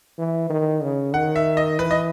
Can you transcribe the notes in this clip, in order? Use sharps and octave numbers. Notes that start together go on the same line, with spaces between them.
E3
D#3
C#3
D#3 F#5
E5
D#5
E3 B4
D#5